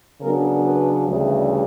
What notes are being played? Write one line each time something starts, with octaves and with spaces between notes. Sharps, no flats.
C#3 F#3 B3 D4 A#4
B4
D2 C#3 E3 G3